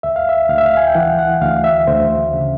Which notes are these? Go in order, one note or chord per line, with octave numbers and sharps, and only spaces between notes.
D2 E5
F5
E5
D2 F5
E5
F5
G#5
G5
E3 F#5
F#5
D2 F5
E5
D2 C5
C#3